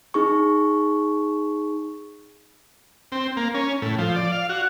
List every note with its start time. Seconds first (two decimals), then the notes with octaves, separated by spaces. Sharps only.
0.14 D#4 G#4 C#6
3.12 C4
3.37 A#3
3.54 C#4
3.82 A2
3.98 F3
4.16 D5
4.32 F5
4.49 F#4